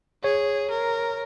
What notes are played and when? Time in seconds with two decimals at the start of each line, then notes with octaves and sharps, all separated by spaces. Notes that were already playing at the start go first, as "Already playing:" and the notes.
0.24 G#4 C#5
0.70 A#4